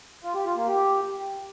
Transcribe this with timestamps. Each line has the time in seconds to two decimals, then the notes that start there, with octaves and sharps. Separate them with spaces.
0.24 F4
0.35 G4
0.45 F4
0.56 A#3
0.67 G4